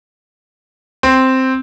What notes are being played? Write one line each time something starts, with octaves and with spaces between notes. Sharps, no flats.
C4